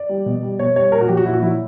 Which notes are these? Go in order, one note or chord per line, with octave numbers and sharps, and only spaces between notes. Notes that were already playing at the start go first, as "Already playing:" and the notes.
Already playing: D5
G3
B2
G3
B2 C#5
G3 C#5
A#2 A#4
F#4
F#3 G4
F#4
A#2 E4
F#4
F#3 E4